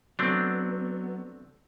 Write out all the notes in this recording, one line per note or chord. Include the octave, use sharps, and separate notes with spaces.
F#3 A3 B3 C4 D4